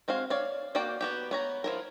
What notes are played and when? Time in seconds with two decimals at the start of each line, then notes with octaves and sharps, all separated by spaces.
0.08 G#3 C4 F#4 F5
0.30 C#5 D5 F5
0.75 A#3 F#4 D5 G5
1.01 B3 F#4 G4
1.31 B3 C#5 A#5
1.64 F3 E4 A#4